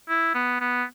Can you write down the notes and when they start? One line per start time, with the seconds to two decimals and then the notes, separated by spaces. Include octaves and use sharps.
0.09 E4
0.35 B3
0.61 B3